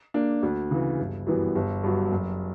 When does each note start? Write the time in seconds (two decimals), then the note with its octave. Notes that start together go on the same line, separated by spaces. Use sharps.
0.14 A#3 D4
0.43 D2
0.71 C#3 E3
0.99 G1
1.26 F#2 E3 G3 B3
1.55 G1
1.84 G2 F#3
2.12 F#1